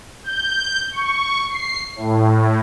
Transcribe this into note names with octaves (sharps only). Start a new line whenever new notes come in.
G6
C#6
C7
A2